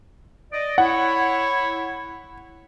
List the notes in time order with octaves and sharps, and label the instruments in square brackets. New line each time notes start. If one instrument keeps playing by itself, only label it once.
[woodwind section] D5 D#5
[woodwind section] E4 C#5 [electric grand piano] F#5